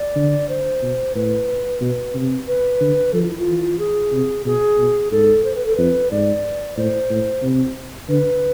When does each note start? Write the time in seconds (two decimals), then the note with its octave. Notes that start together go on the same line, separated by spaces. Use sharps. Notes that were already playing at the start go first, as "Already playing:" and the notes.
Already playing: D5
0.15 D3
0.48 C5
0.82 B2
1.15 A2 B4
1.81 B2
2.14 C3
2.47 B4
2.80 D3
3.13 F3 A4
3.21 F4
3.30 E4
3.38 F4
3.47 E3
3.79 G#4
4.12 C3
4.45 B2 G#4
4.78 B2
5.11 G#2 A4
5.44 C5
5.55 B4
5.66 A4
5.75 F2 B4
6.11 G#2 D5
6.77 A2 C5
7.10 A2
7.42 C3
8.08 D3 B4